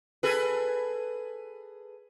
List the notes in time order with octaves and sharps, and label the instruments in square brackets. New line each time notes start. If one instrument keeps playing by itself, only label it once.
[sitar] G#4 A4 B4